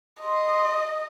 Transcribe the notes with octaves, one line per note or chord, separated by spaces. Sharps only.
D#5 C6